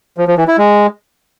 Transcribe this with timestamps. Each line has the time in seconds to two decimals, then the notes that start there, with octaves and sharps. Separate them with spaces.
0.18 F3
0.28 F3
0.38 E3
0.48 E4
0.58 G#3